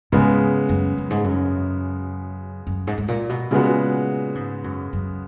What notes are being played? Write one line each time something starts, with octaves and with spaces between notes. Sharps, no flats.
G#2 C#3 G#3 B3
F#2
F#2
G#2
F#2
F#2
G#2
G#2
A#2
B2
A#2 C#3 G#3 B3 F#4
G#2
F#2
F#2